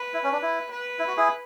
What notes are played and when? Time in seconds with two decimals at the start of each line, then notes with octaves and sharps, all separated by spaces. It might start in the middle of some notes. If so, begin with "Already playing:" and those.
Already playing: B4
0.14 E4
0.24 C#4
0.32 D4
0.42 E4
0.71 B4
0.99 E4
1.08 F#4
1.17 E4 G#4